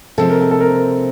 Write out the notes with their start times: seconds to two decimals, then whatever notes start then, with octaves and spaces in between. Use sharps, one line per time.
0.18 C3 F3 G#3 C4 A4
0.30 A#4
0.41 A4
0.51 A4
0.61 A#4